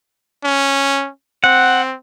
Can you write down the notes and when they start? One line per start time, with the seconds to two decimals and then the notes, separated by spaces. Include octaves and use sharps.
0.44 C#4
1.44 C4 F#5